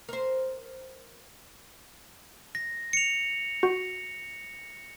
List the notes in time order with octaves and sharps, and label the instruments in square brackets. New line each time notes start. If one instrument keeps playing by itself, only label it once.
[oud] A#4 C5
[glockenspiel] A#6
C#7 F7
[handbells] F#4